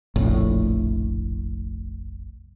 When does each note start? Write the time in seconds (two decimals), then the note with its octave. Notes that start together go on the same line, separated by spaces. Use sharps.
0.16 F1 A#1 A2